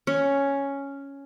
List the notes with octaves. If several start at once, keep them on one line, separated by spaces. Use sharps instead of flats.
C#4